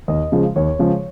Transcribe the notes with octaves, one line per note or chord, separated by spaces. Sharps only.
D#2 D#5
C#3 F3 G#3
D#2 C#5
C#3 F3 G#3